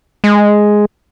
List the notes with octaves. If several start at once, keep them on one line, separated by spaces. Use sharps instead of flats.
G#3